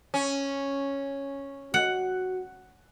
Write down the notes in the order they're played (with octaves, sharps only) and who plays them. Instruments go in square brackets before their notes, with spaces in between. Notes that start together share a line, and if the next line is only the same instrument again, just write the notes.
[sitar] C#4
[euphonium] F#4 [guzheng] F#5